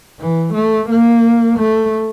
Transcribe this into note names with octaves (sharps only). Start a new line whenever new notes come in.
E3
A3
A#3
A3